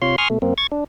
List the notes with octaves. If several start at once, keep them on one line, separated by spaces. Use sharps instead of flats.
C3 F4 C#5 C6
G#5 C6 C#6 D#6 F6
B2 A3
F#2 A#3 C4
C#6 G#6 A6
D4